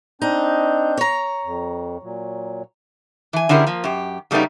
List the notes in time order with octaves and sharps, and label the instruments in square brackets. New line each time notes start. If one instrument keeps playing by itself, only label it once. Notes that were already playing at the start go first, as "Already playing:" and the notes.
[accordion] C4 D4 G6 [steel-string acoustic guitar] D#4
[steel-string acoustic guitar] C#5 A#5
[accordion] F2
A#2 F#3
[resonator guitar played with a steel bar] E3 G#5
D3 C#4 E4 G4 G#4 A#4
F3 A#3
F#2 G4
C#3 G3 A3 B3 D#4